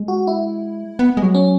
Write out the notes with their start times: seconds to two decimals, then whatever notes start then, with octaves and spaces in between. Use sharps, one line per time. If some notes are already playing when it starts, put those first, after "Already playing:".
Already playing: G#3
0.08 F#4
0.27 E4
0.99 B3
1.17 G#3
1.22 F#3
1.35 C#4